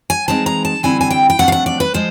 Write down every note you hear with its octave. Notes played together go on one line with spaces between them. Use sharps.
G#5
E3 G#3 C4 D#4 A5
A#5
A5
D3 G3 C4 E4 G#5
G#5
G5
G5
C3 F3 A3 D4 F#5
F5
F#5
D5
B4
F3 G#3 C5